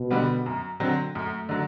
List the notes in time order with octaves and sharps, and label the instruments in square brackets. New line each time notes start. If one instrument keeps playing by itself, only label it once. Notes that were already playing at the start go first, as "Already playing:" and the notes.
Already playing: [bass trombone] B2
[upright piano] D3 G3 B3
F#2
D3 F#3 C4
[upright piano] F#2 [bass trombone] A3
[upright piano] D3 F#3